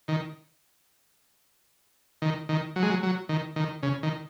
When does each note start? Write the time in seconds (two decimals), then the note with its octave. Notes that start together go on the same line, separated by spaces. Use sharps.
0.08 D#3
2.22 D#3
2.49 D#3
2.76 F#3
2.83 G#3
2.90 F#3
3.03 F#3
3.29 D#3
3.56 D#3
3.83 C#3
4.03 D#3